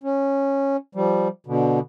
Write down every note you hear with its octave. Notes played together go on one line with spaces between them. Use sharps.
C#4
F3 G3
B2 D3